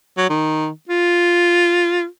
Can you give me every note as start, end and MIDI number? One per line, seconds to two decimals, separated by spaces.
0.18 0.29 54
0.30 0.68 51
0.89 2.06 65